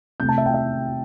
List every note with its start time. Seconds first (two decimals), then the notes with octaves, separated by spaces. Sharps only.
0.20 C3 A3 G6
0.29 A5
0.38 E5
0.46 G5
0.54 E5